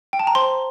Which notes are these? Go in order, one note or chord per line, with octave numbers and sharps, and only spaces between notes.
G5
A5
A#5
C5 C6